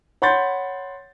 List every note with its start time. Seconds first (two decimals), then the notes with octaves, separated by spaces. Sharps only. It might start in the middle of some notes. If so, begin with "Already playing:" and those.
0.22 C#5 F#5 B5 C6 G6 A6